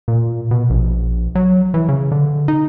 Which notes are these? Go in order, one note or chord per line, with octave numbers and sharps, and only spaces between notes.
A#2
B2
A#1
F#3
E3
C#3
D3
D#4